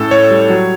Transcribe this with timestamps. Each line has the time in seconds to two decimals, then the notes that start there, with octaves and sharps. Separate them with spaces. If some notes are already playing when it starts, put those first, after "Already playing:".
Already playing: A2 C#4 A4
0.11 A2 C#5
0.31 G3
0.49 F#3